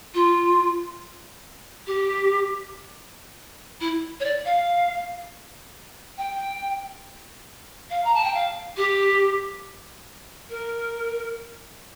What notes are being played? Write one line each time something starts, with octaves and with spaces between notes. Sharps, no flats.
F4
G4
E4
C#5
D5
F5
G5
F5
A#5
A5
G5
F5
G4
A#4